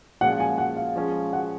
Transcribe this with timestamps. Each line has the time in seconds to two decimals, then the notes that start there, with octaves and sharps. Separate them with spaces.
0.21 A#2 F3 G#3 C#4 F#5
0.40 G#5
0.58 F#5
0.77 F5
0.96 F3 G#3 C#4
1.33 F#5